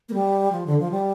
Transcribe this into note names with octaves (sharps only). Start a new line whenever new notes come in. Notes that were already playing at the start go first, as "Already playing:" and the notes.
A#3
G3
F3
D3
F3
G3